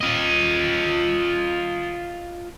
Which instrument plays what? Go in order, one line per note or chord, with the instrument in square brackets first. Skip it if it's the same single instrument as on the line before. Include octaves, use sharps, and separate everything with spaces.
[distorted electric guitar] F4 D#5